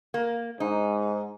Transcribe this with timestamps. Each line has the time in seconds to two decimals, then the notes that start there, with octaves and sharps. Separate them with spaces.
0.14 A#3
0.60 G#2 D#4